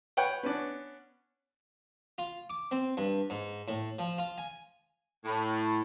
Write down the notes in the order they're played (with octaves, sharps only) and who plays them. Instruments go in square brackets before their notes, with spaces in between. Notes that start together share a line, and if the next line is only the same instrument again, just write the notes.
[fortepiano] B4 C#5 F#5 G5
B3 C#4 D4
[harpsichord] F4
D6
C4
G2
G#2
A2
F3
F4
G#5
[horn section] A2